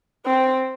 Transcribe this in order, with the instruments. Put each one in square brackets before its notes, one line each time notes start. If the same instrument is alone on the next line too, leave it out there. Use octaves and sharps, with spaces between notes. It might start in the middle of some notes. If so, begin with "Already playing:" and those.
[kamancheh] C4